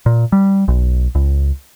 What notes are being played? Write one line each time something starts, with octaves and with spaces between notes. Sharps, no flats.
A#2
G3
B1
C#2